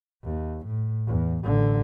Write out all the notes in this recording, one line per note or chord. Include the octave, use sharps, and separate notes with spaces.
D#2
A2
E2
A1 D3